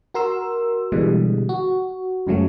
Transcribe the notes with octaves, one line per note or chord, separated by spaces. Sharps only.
F#4 A#4 C6 E6
B2 D3 E3 G3 G#3
F#4
F#2 C#3 F3 F#3 G#3 A3